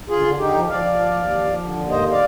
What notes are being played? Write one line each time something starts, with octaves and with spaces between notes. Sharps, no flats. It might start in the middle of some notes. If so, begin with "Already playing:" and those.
D2 F4 G#4
D3
D3 D#4 G4
F3
F3 D5 F5
F3
D#2
D#2
F3
F3
D3
D#2
G#2 C5 D#5
D5 F5